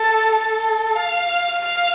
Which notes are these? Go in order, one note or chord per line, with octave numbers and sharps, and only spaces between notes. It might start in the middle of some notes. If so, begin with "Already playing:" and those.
Already playing: A4
A4
F5
F5